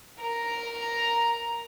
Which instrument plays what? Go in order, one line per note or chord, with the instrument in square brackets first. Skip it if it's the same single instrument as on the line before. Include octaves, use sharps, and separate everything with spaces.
[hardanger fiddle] A#4 A#5